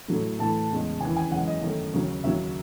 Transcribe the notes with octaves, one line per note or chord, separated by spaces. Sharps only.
A2 F#3 A3
A2 E3 A3 A5
E2 C#3 G#3
D#2 C#3 E3 G#5
G#5
F#2 E3 G#3 F#5
D#5
F#2 D#3 A3
D#2 C#3 F#3
D#2 C#3 F#3 E5